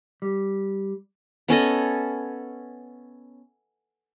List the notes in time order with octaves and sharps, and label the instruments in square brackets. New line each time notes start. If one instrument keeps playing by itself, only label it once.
[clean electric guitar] G3
[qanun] B3 C#4 A4 D#5